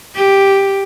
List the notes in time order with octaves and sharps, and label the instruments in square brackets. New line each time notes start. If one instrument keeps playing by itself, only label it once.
[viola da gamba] G4